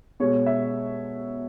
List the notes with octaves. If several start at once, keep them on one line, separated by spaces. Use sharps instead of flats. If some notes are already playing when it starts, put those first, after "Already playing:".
B2 G#3 C#5
E5